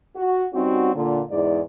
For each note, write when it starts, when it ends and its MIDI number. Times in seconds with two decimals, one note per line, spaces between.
0.16 0.45 66
0.54 0.93 55
0.54 0.93 60
0.54 0.93 61
0.54 0.93 63
0.54 0.93 66
0.94 1.21 46
0.94 1.21 50
1.30 1.60 40
1.30 1.60 44
1.30 1.60 56
1.30 1.60 64
1.30 1.60 74